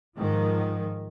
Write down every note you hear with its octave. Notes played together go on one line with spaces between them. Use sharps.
G#2 D#3 F3